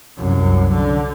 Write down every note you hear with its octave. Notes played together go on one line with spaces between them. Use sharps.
C2 F#2
D3